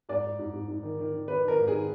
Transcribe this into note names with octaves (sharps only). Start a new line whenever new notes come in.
G#2 D5
G#2
G#2
G#2
G#2
D#3
D#3
D#3
D#3 B4
D#3 A#4
G#2
G#4
D#3